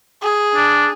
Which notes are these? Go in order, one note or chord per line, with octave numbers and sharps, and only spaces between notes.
G#4
D4